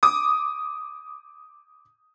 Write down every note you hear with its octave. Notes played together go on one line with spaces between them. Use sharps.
D6 D#6